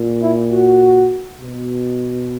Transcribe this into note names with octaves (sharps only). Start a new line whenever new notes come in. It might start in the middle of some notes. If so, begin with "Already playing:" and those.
Already playing: A#2
E4
F#4
B2